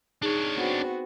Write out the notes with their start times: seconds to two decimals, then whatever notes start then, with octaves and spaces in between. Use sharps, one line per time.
0.22 D4 D#4 G#4 C#5
0.57 B3 C4 F#4